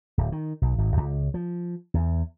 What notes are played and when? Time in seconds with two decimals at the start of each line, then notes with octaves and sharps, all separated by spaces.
0.18 D1
0.32 D#3
0.62 B1
0.78 G#1
0.97 C#2
1.34 F3
1.94 E2